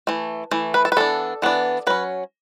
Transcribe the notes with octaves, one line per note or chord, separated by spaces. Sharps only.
E3 A3
E3 A3
B4
A4
B4
E3 B3 D4 A4
E3 B3 D4
F#3 C#4 B4